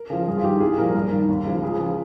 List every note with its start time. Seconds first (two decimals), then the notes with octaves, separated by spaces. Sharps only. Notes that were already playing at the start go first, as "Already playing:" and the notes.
Already playing: A#4
0.10 C#3 F3
0.27 G2 G#4
0.37 F4
0.44 D#3 G4
0.60 C2 G#4
0.78 A#2 F3 A#4
0.94 G2 A#4
1.12 D#3
1.29 D#2
1.46 C#3 F3
1.62 C#2 G#4
1.80 C#3 F3